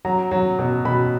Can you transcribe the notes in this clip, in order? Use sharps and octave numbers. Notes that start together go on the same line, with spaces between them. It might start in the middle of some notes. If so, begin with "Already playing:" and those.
F#3 A#5
F#3
B2
B2 B5